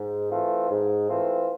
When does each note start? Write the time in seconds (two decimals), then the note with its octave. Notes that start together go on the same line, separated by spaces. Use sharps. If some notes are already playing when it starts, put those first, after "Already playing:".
Already playing: G#2
0.30 E3 A3 C4 F4
0.70 G#2
1.08 E3 A3 C4 F4